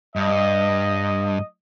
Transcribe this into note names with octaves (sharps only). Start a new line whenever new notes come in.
G2 D#5